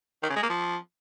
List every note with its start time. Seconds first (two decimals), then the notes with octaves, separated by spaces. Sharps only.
0.23 D#3
0.29 C#3
0.36 G#3
0.43 A#3
0.49 F3